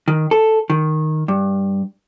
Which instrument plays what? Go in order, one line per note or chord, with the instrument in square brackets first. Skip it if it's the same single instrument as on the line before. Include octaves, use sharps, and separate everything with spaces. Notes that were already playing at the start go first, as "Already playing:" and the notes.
[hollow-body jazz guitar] D#3
A4
D#3
G2